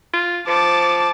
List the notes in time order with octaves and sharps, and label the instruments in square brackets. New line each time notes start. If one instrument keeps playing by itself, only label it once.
[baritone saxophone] F4
[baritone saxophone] F3 [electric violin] A5 D6